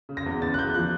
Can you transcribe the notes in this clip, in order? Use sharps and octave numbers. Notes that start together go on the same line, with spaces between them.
C#3
A#6
E2
C#3 A6
F#6
E2 G6
F3 F#6